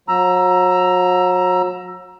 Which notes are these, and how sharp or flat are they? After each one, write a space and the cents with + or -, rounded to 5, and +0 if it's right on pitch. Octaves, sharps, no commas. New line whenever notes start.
F#3 -40 A#5 +10 E6 +15